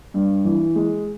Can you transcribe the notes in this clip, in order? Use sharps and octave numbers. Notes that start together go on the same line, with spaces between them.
G2
E3
G#3